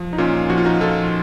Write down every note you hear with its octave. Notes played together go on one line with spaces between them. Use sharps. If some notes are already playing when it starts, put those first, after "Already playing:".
Already playing: F3
D#4
A#2 C#4 F4
F3 F#4
F4
D#4 F#4
F3 F4 A4